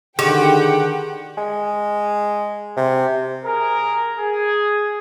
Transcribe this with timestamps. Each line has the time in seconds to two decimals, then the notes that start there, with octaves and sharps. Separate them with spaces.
0.19 D3 D#3 G4 G#4 F#5 G5
1.38 G#3
2.77 C3
3.44 G#4 A#4
4.18 G#4